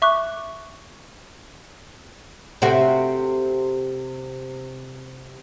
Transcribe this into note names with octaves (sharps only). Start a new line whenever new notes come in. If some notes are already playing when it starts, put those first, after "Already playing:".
E5 C#6 D6 F#6
C3 A3 C4 F#4